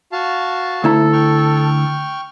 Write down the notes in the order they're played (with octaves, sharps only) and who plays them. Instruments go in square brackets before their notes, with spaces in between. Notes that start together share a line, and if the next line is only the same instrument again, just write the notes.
[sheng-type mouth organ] F#4 F5 A5
[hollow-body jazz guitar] D2 E4 A#5 [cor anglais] A4
[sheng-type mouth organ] G5 C#6 F6